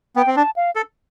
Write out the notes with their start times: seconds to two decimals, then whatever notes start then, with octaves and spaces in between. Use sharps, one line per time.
0.16 B3 G5
0.27 C4
0.37 D4 A5
0.56 F5
0.76 A4